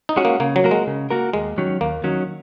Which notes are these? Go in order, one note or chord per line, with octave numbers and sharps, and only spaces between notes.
D#4
G#3 C#4 F#4
A#3
C#3 A#3
F#3
A#3 F#4 A#4
G#3
C#3
A#3 F#4 A#4
D#2 G#3
D#3 F#3 C#4
D#2 A#3
D#3 F#3 C#4